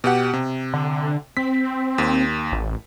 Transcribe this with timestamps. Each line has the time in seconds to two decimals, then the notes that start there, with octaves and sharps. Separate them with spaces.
0.04 B2 G4 F#5
0.33 C3
0.74 D3
1.37 C4 B6
1.98 D#2
2.52 A1